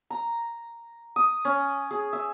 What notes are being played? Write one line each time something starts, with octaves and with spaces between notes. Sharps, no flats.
A#5
D#6
C#4
G#4
E5